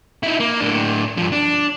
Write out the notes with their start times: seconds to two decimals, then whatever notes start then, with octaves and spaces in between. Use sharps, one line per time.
0.23 D#4 E4
0.40 A#3
0.60 A2 D4
1.18 G2 F3
1.32 D4